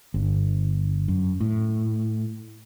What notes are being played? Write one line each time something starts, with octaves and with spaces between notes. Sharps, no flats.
G1
F#2
A2